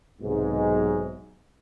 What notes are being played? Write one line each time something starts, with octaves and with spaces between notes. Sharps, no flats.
B1 G#2 C3